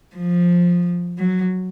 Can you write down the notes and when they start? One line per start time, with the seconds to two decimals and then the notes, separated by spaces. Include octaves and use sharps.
0.16 F3
1.19 F#3